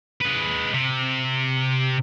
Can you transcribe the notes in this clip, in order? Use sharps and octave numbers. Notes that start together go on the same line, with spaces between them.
G#3 B4
C3